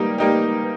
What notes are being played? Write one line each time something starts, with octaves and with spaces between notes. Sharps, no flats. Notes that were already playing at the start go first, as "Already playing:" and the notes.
Already playing: G3 A#3 D#4 G4
G3 A#3 D#4 G4